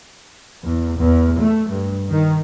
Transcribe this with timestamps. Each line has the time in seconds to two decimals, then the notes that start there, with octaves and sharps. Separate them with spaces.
0.63 E2
0.99 E2
1.39 A3
1.69 G2
2.09 D#3